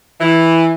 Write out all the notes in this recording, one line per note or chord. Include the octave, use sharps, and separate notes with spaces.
E3